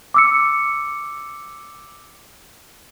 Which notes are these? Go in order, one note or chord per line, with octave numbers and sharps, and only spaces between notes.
D6 E6 C#7